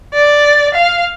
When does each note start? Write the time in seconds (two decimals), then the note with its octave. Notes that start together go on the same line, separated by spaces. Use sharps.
0.14 D5
0.74 F5